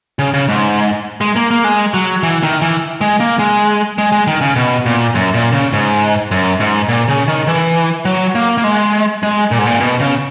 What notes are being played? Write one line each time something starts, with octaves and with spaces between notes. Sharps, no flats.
C#3
C#3
G#2
G#3
A#3
A#3
G#3
F#3
E3
D#3
E3
G#3
A#3
G#3
G#3
G#3
D#3
C#3
B2
A#2
F#2
A#2
C#3
G#2
F#2
G#2
A#2
C#3
D#3
E3
F#3
A#3
A#3
G#3
G#3
A#2
G#2
A#2
B2
C#3